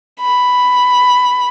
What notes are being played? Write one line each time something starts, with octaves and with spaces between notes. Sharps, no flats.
B5